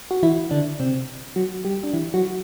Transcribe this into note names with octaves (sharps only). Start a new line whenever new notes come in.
F#4
E3 E4
D3 D4
C3 C4
F#3 F#4
G3 G4
D4
E3 E4
F#3 F#4